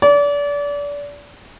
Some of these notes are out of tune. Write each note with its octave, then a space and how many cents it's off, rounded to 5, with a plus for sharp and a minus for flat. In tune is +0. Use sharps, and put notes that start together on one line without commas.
D5 -30